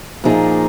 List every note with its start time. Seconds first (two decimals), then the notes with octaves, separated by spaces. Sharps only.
0.24 A#2 F3 A#3 D#4 G#4